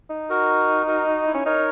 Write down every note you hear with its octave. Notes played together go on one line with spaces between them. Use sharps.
D#4
F#4 A#4
F#4 A#4
F#4
E4
C#4
D#4 A#4 C#5